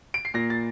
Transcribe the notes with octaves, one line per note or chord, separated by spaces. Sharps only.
D7
C7
A#2 A#6
A6